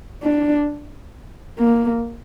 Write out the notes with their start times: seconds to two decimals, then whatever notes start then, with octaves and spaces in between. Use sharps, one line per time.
0.23 D4
1.58 A#3